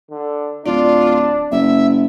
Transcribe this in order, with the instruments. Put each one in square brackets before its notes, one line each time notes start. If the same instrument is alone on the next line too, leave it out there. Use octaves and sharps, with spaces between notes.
[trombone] D3
[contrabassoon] D1 [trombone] D4 [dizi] F4 [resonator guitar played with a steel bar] D5
[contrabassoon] F#1 [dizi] E5